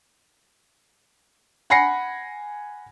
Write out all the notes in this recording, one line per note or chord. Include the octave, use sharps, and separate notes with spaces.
F#5 G#5 B5 A#6 C7 C#7